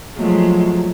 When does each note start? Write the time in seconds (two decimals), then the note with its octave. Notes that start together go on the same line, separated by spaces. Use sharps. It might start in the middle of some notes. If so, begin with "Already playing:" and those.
0.16 F3 F#3 G#3 A3